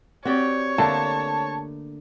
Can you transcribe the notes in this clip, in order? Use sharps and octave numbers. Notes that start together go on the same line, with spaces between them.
C4 F#4 G4 C#5 D5
D3 A3 A#3 A5